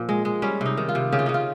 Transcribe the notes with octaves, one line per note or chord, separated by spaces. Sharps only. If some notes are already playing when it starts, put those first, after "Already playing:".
Already playing: A#2 F3
G#3
G#3
G3 C#4
C3 D#4
D#3
F4
C3
C#3 G4
F4
C#3 D#4
F4